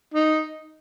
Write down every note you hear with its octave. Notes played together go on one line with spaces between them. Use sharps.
D#4